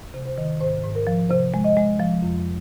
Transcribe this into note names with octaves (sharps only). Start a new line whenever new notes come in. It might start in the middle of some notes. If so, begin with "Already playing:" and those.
C3
C5
D#3
G#2 C5
G#2
A#4
F3
C3 C5
G#3
D#5
G#3
F3
F2